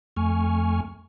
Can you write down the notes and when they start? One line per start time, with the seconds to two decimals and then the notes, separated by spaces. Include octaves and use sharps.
0.17 F2 A3 G#5 C#6 F6